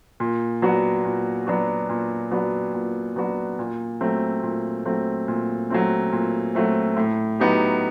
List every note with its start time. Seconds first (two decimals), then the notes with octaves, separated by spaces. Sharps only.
0.20 A#2
0.62 F#3 B3 D4 F#4
1.05 A#2
1.47 F#3 B3 D4 F#4
1.89 A#2
2.31 F#3 B3 D4 F#4
2.74 A#2
3.16 F#3 B3 D4 F#4
3.59 A#2
4.01 F#3 A3 C4
4.43 A#2
4.85 F#3 A3 C4
5.28 A#2
5.70 F#3 A3 C4
6.12 A#2
6.55 F#3 A3 C4
6.97 A2
7.40 F#3 B3 D#4 G4